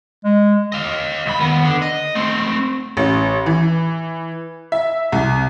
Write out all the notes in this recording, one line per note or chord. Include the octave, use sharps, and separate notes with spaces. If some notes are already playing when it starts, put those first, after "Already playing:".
G#3
D#5 F5
C2 B5
D#2 B3
D3
D#5
A3 C4
A1
E3
E5
C2